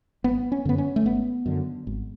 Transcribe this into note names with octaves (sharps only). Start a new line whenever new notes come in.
G#1 B3
C#4
F#2 D3 B3
C#4
A3
G#1 B3
F#2 D3
G#1